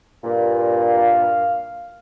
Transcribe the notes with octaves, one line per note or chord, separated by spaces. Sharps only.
G2 A#2
F5